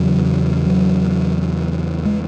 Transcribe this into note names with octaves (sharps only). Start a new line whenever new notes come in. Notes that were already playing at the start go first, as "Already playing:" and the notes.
Already playing: E2 C#3 F#3
F#3
G#3